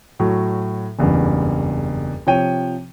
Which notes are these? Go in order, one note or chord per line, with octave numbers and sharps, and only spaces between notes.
A2 F#3
F#1 E2 G2
C3 F3 C#5 G5 D#7